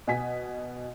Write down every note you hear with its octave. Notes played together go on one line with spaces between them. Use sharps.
B2 G#5 B6